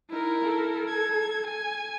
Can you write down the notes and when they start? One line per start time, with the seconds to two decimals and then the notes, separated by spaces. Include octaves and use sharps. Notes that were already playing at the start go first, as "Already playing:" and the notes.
0.10 D#4 E4 A#4
0.43 A4
0.88 G#6
1.46 G#5